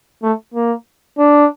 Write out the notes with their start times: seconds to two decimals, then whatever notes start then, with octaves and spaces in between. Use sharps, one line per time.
0.23 A3
0.54 A#3
1.18 D4